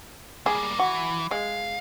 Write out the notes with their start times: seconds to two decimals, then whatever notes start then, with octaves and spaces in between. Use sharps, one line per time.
0.46 G3 A#3 G#4
0.79 E3 F#4
1.31 G#3 F5